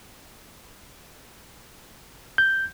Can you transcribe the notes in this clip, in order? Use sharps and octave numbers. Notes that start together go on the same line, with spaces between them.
G6